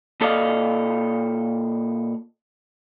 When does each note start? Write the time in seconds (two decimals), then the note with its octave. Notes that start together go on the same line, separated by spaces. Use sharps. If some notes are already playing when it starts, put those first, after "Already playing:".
0.21 A#2 A4 D5 D#5 F5